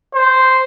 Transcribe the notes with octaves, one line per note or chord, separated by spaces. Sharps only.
C5